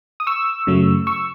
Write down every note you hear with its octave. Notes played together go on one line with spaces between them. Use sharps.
D#6
C#6 E6
F#2 C#3 F#3 A3
C#6 E6